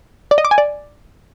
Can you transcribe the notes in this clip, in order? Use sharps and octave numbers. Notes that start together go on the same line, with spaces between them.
D5
D#5
D6
G#5
D5